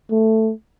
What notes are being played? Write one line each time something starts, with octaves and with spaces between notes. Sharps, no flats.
A3